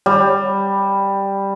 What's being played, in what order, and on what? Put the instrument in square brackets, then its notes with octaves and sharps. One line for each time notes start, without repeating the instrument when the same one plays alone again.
[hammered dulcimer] G3